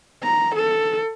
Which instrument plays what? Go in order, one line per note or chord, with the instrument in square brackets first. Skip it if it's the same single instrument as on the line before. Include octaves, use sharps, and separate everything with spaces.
[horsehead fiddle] A#5
A4